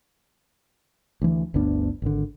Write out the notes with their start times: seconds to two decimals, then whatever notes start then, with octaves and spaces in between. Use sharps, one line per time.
1.22 D2 E3
1.54 G1 D2 B3 D4
2.02 G#1 D3